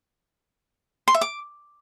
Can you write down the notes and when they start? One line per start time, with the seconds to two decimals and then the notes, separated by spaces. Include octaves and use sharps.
1.08 C6
1.14 E5
1.21 D6